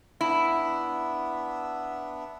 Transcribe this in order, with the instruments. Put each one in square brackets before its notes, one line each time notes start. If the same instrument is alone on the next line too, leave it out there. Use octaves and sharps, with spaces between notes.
[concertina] B3 D4 E5 [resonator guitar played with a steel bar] E4